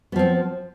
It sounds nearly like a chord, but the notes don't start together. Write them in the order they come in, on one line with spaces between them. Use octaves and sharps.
B3 F3 C4